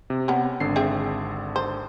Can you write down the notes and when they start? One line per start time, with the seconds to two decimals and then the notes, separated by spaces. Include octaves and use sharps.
0.10 C3
0.28 B3 C#4
0.60 G#1 D3 C7
0.76 C4 G#4 E5
1.56 C5